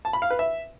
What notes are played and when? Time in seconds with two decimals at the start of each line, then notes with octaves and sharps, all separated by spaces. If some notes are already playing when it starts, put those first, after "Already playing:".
0.05 A5
0.13 B5
0.22 F5
0.31 B4
0.39 E5